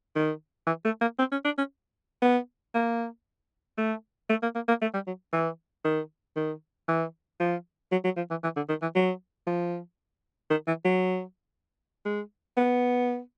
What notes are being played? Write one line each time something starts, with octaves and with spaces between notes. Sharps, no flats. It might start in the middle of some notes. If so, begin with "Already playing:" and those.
D#3
E3
A3
A#3
C4
C#4
D4
C#4
B3
A#3
A3
A3
A#3
A#3
A#3
A3
G3
F#3
E3
D#3
D#3
E3
F3
F#3
F#3
F3
E3
E3
D3
D#3
E3
F#3
F3
D#3
E3
F#3
G#3
B3